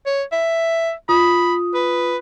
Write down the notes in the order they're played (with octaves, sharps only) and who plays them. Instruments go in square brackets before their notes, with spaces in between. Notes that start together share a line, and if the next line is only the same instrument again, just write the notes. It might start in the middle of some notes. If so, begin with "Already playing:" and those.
[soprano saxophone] C#5
E5
[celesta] F4 D#6 [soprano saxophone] B5
[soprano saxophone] B4